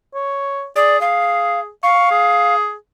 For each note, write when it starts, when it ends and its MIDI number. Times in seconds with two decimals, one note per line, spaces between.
0.14 0.67 73
0.76 0.98 68
0.76 1.00 74
1.01 1.69 68
1.01 1.60 77
1.83 2.55 77
1.83 2.10 85
2.11 2.74 68